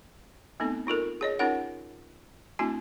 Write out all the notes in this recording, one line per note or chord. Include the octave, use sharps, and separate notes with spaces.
A3 B3 C4 D#4 A4
D#4 F4 A4 A#4
G#4 C#5 D#5
C#4 D#4 F4 A#4 C#5 F#5
A3 C4 D4 E4 F#4 G#5